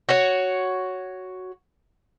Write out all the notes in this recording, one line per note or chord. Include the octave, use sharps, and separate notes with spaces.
F#4 C#5